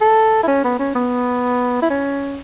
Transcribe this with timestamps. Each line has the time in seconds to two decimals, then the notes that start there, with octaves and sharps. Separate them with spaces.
0.01 A4
0.43 E4
0.48 C#4
0.64 B3
0.79 C#4
0.95 B3
1.82 E4
1.90 C#4